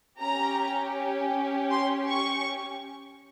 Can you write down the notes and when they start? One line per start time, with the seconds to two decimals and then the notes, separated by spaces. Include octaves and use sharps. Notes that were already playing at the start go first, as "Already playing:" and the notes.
0.20 C#4 G4 A#5
1.71 C6
2.09 C#6